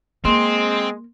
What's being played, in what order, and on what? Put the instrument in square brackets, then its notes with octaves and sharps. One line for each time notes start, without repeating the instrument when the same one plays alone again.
[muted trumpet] G#3 [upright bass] A#3 [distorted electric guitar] C4 [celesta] C6